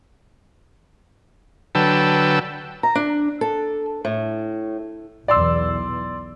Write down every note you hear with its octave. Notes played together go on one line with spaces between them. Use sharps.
D3 F#3 B4 G5 A5 E6
A#5
D4
A4
A2
B1 E2 D5 C6 E6